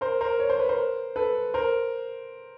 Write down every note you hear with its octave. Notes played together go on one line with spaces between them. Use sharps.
A#4 C5
A#4 C5
C#5
C5
B4
A#4 C5
A4 B4
A#4 C5